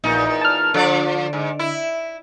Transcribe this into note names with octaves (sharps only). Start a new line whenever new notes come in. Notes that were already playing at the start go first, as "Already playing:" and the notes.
A#1 E2 A#2 D#4
A5 F6
D3 F3 D5
G#2
E4